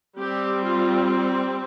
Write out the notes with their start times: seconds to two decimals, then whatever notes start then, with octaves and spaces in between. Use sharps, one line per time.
0.18 G3 C4 G4
0.64 F4